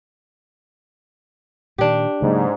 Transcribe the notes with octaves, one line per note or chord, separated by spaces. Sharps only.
A#2 D#3 D4 G4
G#2 C#3 F#3 A#3